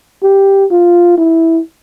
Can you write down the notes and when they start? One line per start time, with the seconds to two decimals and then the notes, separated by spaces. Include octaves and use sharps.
0.23 G4
0.71 F4
1.18 E4